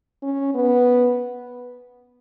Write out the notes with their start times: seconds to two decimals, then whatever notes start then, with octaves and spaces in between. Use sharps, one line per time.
0.22 C#4
0.54 B3